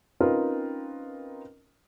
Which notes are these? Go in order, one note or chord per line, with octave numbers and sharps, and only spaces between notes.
C4 C#4 D#4 F4 A#4 B4